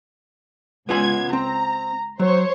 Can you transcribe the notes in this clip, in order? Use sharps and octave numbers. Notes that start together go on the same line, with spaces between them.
C#2 B3 F4 G#5 G#6
C4 A#5
F#3 C5 C#5